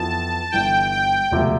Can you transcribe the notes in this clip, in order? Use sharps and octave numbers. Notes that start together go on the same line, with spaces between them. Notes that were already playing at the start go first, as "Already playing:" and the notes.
Already playing: F2 E3 B3 F4 A5
G1 G2 E3 G5
G5
E1 D2 C3 F3